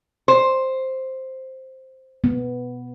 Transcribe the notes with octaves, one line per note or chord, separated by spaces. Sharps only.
C5
B3